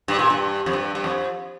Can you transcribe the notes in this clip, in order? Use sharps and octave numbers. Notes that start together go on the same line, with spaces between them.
G2
A#2
G2
F2
G2
G2
F2